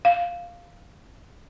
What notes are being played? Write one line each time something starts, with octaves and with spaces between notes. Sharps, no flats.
F5